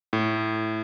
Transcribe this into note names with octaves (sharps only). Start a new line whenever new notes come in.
A2